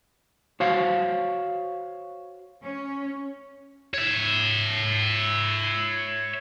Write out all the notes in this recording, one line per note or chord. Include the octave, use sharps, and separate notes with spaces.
F#4 C5 C#5 F5
C#4
C#5 E5